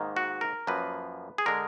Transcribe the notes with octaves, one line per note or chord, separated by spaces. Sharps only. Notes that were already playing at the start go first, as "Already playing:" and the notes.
Already playing: G#2 D#3 A#3
F#4
A#4
F#2 F3 A#3 B4
G#4
D3 G#3 A#4